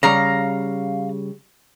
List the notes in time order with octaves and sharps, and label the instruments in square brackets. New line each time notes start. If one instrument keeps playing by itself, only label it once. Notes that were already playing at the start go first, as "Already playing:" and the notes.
[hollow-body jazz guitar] C#3 G3 [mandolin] F5 A#5